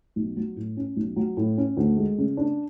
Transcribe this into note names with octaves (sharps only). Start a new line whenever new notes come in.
B1
F#3
A2
C#4
B1
F#3
A2
C#4
D2
G#3
C#3
D4